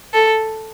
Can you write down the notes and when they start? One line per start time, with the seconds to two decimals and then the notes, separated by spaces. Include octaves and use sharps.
0.14 A4